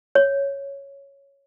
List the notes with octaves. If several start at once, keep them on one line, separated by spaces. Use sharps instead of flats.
C#5